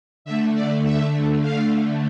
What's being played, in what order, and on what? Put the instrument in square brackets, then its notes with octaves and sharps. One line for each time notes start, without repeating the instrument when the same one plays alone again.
[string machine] D3 A3 E5
D5
E5
F5